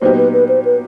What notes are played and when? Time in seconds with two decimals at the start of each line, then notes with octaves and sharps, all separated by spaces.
0.02 A#2 F#3 B3 D#4 G4 C5
0.17 B4
0.33 B4
0.49 C5
0.65 B4